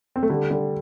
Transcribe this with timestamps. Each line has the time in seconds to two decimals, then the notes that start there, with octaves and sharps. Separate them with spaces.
0.16 C4
0.23 A3
0.30 D3 G3
0.51 D3 G3